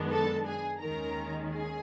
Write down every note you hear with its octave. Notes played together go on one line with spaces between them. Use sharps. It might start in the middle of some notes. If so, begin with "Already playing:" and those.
Already playing: F#2 D#3 G#3 B3 D4
A4 A5
G#4 G#5
D#2 D#3 G#3 C#4 A#4 A#5
G#4 G#5